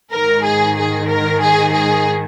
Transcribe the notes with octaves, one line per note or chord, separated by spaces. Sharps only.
G#2 D#3 A#4
G#4
G#4
A#4
G#4
G#4